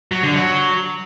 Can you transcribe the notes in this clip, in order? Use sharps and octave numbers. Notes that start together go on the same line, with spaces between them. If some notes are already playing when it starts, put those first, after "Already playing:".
F#3
D3
F#3